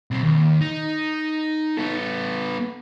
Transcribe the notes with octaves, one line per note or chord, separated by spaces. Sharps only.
B1 C4
D#2
D#4
B3 A4